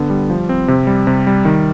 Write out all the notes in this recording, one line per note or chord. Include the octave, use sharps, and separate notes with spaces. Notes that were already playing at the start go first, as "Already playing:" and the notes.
Already playing: D3 B3
G3
F3
C4
C3
G3
C3
G3
D#3